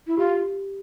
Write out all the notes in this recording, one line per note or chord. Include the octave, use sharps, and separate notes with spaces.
E4
F4 G4